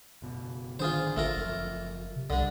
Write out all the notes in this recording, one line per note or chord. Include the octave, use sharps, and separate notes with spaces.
F#1 B2
A1 D3 D#3 D4 F4 G#4 C5
G#1 A3 F4 A#4
F#1 F#2 F3
C3
G1 C2 G2 D3 D4